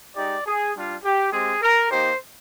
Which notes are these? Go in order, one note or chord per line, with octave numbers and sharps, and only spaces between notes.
G#3 D#4 G4 D5
G#4
G3 D4 F4
G4
G#3 C4 G4 G#4
A#4
A#3 D#4 G4 C5